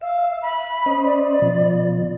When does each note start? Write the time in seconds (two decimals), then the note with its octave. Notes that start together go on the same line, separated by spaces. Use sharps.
0.01 E5 F5
0.42 B5
0.86 C#4 C5 D#5
1.05 D5
1.42 B2 F3